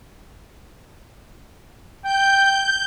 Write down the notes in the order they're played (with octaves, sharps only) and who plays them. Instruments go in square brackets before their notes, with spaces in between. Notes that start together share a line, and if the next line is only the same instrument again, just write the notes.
[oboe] G5 [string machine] G6